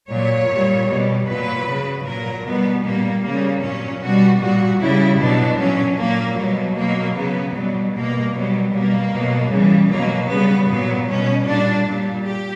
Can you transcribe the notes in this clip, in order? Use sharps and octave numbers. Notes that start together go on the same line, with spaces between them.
A#2 F#3 C#5
A#2 G3
B2 G3
A#2 F#3 B4
C#3 F#3
A#2 F#3 A#4
B2 G3 B3
A#2 G3 A#3
C#3 G3 A#3
A#2 F#3 C#4
B2 G3 F#4
A#2 G3 F#4
C#3 G3 E4
B2 F#3 D4
A#2 F#3 C#4
A#2 F#3 A#3
B2 F#3 G3
B2 F#3 A#3
C#3 F#3 B3
B2 F#3 G3
B2 G3 A#3
B2 F#3 G3
B2 G3 A#3
B2 F#3
C#3 E3 G3
B2 F#3 A#3
C#3 G3 B3
A#2 F#3 B3
B2 G3 C#4
A#2 G3 D4
A#2 G3
G4